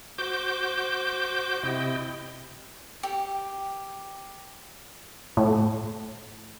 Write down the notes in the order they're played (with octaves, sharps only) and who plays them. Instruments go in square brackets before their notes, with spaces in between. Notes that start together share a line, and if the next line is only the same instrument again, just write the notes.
[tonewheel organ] F#4 C5 D6 G6
C3 E4 D#5 G5
[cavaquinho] G4
[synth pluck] A2